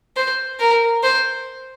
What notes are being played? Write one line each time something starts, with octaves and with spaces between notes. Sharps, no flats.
C5
A#4
C5